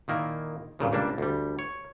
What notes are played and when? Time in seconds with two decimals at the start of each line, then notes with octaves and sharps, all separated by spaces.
0.08 A#2 D#3 A#3 E4
0.79 G2 A#2 C#3 F3
0.92 C#2 G3 A#3 D4 A5
1.18 D2 G3
1.59 C#5